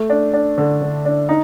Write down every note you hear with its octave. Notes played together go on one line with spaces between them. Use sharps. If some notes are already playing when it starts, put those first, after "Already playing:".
Already playing: A3
D4
D4
D3
D3
D4
D#4